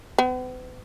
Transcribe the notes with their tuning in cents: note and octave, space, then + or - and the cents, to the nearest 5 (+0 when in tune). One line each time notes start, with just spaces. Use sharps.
B3 +40